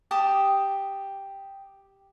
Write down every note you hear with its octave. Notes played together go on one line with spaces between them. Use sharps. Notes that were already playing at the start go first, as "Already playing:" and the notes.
G4 A5 D#6